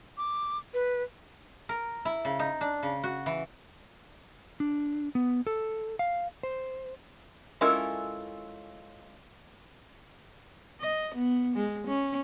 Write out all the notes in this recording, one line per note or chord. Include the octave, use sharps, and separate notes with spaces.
D6
B4
A#4
E4
C#3
D#4
D4
C#3
F#4
E3
D4
B3
A4
F5
C5
G#3 C#4 E4 F4 A4 A#4
D#5
B3
G#3
C#4